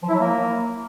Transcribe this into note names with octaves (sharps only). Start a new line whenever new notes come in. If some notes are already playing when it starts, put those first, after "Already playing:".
F3
E4
F#3
A#3